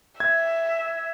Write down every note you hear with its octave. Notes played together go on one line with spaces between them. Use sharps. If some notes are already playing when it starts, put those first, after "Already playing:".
E5 G#6